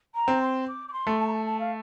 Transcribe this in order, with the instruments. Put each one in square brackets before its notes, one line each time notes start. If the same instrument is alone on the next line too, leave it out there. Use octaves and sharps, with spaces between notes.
[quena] A#5
[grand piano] C4
[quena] C6
D6
D6
C6
[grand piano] A3
[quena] A5
A#5
A5
A5
F5